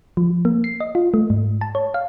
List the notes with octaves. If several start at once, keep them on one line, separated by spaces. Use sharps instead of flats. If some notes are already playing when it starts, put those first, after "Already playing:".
F3
A#3
C7
D#5
F4
A3
G#2
A5
C#5
F5